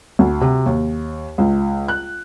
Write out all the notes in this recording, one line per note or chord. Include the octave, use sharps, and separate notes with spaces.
D2
C3
D#2
C#2
F#6